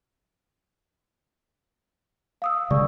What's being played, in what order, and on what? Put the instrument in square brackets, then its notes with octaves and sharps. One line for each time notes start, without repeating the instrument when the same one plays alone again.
[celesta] F5 D#6 E6
[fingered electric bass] C#3 G3 G#3 [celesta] D5 C#6